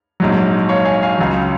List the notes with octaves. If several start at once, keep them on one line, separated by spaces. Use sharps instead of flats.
A#1 G#2 F#3
C#5 F5
F5 G#5
F5 G#5
C#2 C#3 F#3